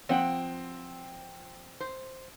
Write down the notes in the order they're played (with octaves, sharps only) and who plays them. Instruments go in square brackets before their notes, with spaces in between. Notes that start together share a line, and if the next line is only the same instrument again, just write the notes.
[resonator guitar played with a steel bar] F3 F#5 G5 [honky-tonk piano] C4
[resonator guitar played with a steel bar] C5